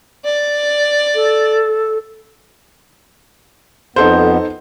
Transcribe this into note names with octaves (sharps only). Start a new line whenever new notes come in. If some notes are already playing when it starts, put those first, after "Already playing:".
D5
A4
F2 B3 D#4 A4 C5